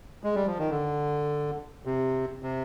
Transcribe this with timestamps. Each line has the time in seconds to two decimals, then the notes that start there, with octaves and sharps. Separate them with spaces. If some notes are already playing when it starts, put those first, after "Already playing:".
0.24 G#3
0.35 G3
0.46 F3
0.59 D#3
0.70 D3
1.85 C3
2.43 C3